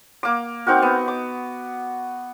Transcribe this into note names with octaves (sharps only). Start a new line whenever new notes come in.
A#3 D6
C4 D#4 F#4 A#4
B3
D6